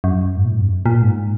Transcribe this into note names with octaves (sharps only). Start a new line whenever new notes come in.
F#2
G#2
A#2
G#2
F#2
A#2
G#2